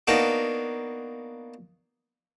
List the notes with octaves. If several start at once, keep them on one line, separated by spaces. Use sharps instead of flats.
A#3 B3 D4 D#4 F#4